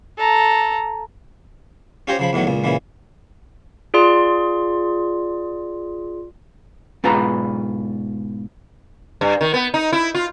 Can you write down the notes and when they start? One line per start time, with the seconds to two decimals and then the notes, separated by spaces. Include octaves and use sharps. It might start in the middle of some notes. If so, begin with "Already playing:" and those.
0.18 A4 A#5
2.07 C#4 F4 G4 C5 C#5 A#5
2.19 C#3 F3 B5
2.33 E2 A2 D#3 F#3
2.47 C#2 A#2
2.64 A#2 C#3 E3
3.94 F4 G#4 D5 C6
7.04 G#2 B2 F4 B4 A#5
9.21 G2
9.41 D#3
9.54 B3
9.74 D#4
9.93 E4
10.15 F4